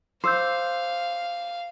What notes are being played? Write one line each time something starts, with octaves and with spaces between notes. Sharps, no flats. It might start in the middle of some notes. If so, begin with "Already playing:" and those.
C5 F5 D6 E6 G6